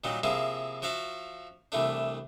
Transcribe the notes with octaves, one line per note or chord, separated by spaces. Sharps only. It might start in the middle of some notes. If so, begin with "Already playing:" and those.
A#2 D#3 F#3 G3
C3 F3 A#3 E4 G#4
F3 F#4 E5 F5
C2 E3 A3 D4